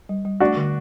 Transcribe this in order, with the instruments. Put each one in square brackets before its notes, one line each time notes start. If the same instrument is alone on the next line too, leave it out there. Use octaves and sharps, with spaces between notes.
[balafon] G3
G3
[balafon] A3 [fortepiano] D4 F#4
[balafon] D3